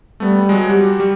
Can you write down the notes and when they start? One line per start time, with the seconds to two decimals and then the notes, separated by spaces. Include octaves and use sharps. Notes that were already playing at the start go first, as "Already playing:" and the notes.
0.20 G3 A3 B3
0.49 F#3 G#3
0.69 G3 F#4 G4
1.00 G3